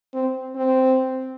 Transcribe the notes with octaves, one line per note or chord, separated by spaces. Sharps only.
C4
C4